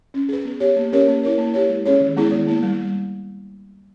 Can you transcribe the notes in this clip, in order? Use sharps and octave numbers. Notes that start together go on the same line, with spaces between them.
C#4
G#4 B4
B3
G4 C#5
A#3
C#4 G4 A#4 C#5
A#3
E4 A#4 C#5
A#3
E4 G4 C#5
G#3
C#4 G#4 C#5
D#3
G#3 B3 E4 G#4
D#3
A#3 E4
G3